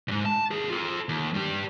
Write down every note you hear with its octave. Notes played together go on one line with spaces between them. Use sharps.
E2 G#2
A5
D#2 G#4
F4 A4
D#2
G2 G4